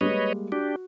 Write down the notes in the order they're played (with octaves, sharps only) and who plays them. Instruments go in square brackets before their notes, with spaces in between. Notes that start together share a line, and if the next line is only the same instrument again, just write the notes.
[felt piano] G3 G#3 A#3 [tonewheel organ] B4 C#5 D#5
[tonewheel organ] D4 G4 [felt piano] F#4